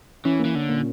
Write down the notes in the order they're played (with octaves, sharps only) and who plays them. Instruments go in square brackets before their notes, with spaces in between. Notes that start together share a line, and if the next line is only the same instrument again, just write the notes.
[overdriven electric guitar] E3 [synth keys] C#4
[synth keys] A#3
[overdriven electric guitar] E3
D3
[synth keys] A#2